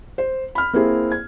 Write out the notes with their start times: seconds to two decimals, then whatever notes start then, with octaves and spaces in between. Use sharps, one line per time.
0.18 C5
0.55 B5 F6
0.73 A#3 C4 E4 G#4
1.12 G#6